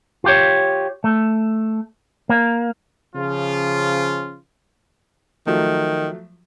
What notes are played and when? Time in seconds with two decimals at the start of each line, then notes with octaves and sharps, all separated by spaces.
0.24 F4 G4 C#5
1.04 A3
2.29 A#3
3.16 C#3 F3 F4
5.47 D#3 F3 F#3 A3